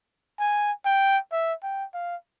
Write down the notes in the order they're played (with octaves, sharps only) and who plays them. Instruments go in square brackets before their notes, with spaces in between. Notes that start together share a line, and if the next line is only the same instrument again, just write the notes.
[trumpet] G#5
G5
E5
G5
F5